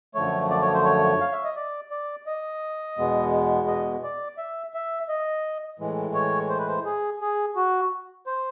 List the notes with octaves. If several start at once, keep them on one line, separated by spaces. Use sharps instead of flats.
F#2 D3 F3 A3 C#5
D5
C#5
C5
C#5
F5
E5
D#5
D5
D5
D#5
E2 B2 G#3 B3
D#5
D5
E5
E5
D#5
A2 E3 G#3
C#5
C5
B4
C5
G#4
G#4
F#4
C5